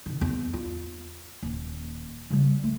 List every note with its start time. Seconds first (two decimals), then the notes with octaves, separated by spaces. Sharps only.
0.06 C3 D#3
0.21 E2
0.53 F4
1.42 D#1 C#4
2.30 C#3 G3
2.64 A3